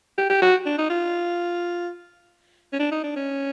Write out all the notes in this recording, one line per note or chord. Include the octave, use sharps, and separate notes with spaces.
G4
G4
F#4
D4
D#4
F4
C#4
D4
D#4
D4
C#4